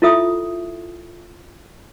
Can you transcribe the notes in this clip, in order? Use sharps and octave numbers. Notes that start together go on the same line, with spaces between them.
E4 F4 A4 E5 D#6